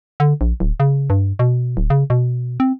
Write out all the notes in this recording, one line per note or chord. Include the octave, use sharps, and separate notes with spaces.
D3
A#1
D1
C#3
G2
B2
D1
C#3
B2
C4